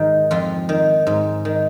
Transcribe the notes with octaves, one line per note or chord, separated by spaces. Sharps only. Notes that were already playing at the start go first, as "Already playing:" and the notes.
Already playing: G#2 D#3 G#4 A#4
F2 F4
D#3
G#2
D#3